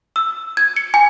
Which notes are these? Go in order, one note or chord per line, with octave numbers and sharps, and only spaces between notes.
E6
G#6
C#7
G#5